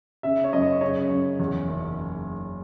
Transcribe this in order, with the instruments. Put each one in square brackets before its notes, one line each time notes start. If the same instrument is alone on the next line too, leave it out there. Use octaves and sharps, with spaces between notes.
[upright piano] C#3 E5
C#5
F#2 D#5
C#3 C#5
F#2
E2
F#1